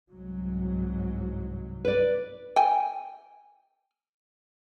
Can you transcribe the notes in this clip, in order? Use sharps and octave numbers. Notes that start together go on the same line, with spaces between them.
C2 G#2 F#3
B4 D5
G5 G#5